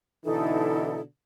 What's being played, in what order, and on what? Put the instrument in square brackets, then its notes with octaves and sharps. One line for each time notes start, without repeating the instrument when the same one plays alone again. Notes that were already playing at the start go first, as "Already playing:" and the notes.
[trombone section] B2 D3 E3 [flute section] D#4 E4 A4